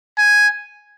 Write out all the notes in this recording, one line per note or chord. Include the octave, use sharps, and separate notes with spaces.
G#5